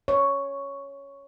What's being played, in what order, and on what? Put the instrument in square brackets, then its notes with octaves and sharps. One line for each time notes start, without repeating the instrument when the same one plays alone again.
[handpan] C#5